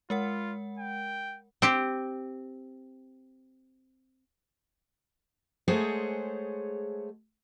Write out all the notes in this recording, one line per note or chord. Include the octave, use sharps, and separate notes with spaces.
G#3 F4 A#4 F#5
G5
C4 G4
G#3 A3 G#4 C5 C#5 F#5